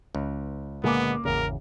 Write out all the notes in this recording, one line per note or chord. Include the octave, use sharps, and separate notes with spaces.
C#2
A#2 D3 G#3 A#3 B3 D6
G#1 E2 C#3 A#4